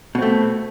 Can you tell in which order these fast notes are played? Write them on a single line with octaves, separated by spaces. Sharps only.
B2 C4 A3